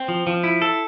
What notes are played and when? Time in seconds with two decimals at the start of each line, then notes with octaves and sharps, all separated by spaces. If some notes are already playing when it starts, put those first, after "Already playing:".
Already playing: C4
0.08 F3
0.27 F3
0.44 E4
0.62 A4